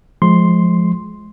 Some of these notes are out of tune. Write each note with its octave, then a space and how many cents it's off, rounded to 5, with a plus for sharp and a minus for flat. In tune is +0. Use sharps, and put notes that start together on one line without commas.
F3 +0 G#3 +15 C6 +0